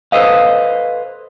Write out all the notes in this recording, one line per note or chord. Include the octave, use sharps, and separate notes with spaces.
A4 B4 C5 D#5 F5